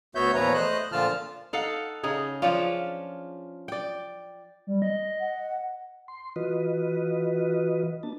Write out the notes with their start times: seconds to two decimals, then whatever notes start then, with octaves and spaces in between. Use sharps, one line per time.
0.15 D2 B3 F#4 C#5 E5 G6
0.34 E2 A#2 F3 B4 C#5 A#5
0.54 A3 C5 D#5 F#6
0.92 A#2 D3 F3 F4 A5 F6
1.53 D#4 A4 F5 F#5
2.03 C#3 D#4 G#4
2.42 F3 C#4 D4 F4
3.68 D5 G5
4.67 G3
4.82 D#5
5.20 F#5
6.08 C6
6.36 E3 F4 F#4 B4 D#5
8.03 A#3 D4 A5